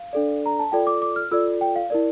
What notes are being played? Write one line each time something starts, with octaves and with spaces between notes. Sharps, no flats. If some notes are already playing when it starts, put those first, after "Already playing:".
Already playing: F5
D4 A4 D5
A#5
A5
F4 A4 D5 G5
D6
D6
F6
F4 A4 D5 E6
G5
F5
E4 A#4 D5